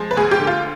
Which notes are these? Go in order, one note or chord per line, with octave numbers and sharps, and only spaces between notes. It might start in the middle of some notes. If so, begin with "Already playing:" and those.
Already playing: F3 G#3
B4
D2 G#4
G4
D3
F4